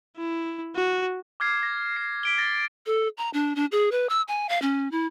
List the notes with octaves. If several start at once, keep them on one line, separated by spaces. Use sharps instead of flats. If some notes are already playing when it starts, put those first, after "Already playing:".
E4
F#4
D6 F6 G#6 C7
A#6
C7
B6 D7 G7
A6 A#6 G7
A4
A#5
D4
D4
G#4
B4
E6
G#5
F5
C#4
E4